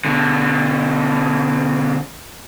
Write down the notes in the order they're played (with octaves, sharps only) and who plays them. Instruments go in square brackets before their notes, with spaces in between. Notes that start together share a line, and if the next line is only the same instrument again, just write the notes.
[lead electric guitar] B2 D3